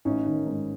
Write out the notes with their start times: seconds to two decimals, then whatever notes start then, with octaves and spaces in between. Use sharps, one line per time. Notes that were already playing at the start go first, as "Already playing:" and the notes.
0.05 A1 C#4 D#4
0.26 D#3
0.46 G#2